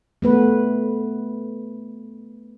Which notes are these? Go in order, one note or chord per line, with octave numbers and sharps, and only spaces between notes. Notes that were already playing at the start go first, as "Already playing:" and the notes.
A3 B3 B4